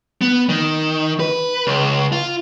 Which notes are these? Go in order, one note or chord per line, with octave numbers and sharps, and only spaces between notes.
B3
D#3
B4
C#2
F4